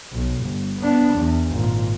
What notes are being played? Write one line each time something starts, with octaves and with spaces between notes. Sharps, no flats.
B1
G1
B3 D4
E2
G#1 A#2